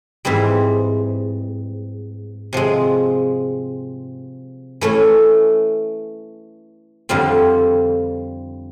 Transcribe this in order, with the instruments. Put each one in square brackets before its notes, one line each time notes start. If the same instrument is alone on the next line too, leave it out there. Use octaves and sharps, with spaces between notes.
[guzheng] G#2 E3 G3 C4
C3 F3 G#3
E3 A3 C#4
F2 D3 G3 C4 F4